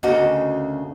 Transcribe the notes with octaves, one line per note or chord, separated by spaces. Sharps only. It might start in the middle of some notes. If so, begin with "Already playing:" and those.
D2 C#3 A#3 C#4 F#4 D#5